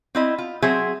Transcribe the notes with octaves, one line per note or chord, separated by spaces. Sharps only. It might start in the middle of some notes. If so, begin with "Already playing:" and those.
C4 E4 D#5
F4
F#3 C4 G#4 C5 E5